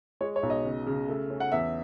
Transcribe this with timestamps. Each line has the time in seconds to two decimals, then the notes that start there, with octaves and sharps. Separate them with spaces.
0.21 G#3 C#5
0.36 C#5
0.43 B1
0.50 D#5
0.65 C#3
0.86 C#3
1.08 A3
1.30 C#4
1.40 F#5
1.52 E2 E5